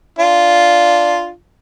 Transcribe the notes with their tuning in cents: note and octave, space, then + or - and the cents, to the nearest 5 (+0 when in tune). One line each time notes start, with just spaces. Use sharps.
D4 +0 F4 +0